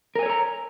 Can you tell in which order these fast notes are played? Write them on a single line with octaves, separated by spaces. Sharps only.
A#4 G#5 C#5 A4 A#5